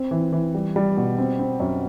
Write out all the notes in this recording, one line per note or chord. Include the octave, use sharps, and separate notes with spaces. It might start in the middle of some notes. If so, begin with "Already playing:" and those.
Already playing: C4
E3
E3
G3
G3
B2
C4
C4
F#2